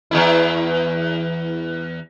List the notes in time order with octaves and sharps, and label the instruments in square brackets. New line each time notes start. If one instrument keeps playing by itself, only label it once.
[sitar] E2 A2 E4